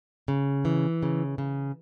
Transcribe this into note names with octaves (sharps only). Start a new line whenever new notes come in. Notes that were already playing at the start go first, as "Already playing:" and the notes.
C#3
E3
C#3
C#3